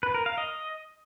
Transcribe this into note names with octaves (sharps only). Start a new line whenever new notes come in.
B4
A#4
F5
D#5